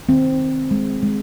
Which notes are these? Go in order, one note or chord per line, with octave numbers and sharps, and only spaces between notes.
D#3 C4
D#3
G#3
G#3